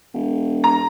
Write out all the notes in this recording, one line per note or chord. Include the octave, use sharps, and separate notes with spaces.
E1
A#5